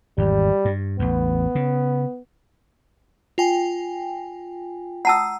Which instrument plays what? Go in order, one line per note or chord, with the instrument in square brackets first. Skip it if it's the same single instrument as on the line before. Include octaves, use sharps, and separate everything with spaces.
[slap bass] G#1 E2 [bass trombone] G3
[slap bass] G2
[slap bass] A1 E2 [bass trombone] B3
[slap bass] C#3
[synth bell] F4 G5 G#5
[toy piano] F#5 A5 E6 [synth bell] A#5 D#6